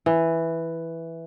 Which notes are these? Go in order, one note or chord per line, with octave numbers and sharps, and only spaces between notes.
E3